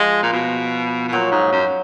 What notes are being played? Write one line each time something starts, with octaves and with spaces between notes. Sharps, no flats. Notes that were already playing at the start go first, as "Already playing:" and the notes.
Already playing: F3 G#3
A#2
B2
B2
A#2 F#3
G#2
F#2